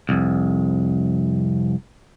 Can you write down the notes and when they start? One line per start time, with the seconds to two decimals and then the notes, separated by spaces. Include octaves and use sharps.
0.09 C2 F2